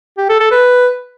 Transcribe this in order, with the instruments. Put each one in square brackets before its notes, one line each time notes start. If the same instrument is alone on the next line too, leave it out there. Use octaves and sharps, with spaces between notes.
[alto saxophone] G4
A4
A4
B4